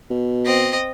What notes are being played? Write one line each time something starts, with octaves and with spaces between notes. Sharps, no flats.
B2
C4 D#5